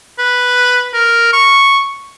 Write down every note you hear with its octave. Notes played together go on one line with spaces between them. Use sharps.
B4
A#4
C#6